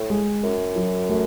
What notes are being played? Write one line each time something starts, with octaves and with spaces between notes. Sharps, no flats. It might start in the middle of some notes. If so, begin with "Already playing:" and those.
Already playing: A2
G#3
F#2 C#4
F#3
A3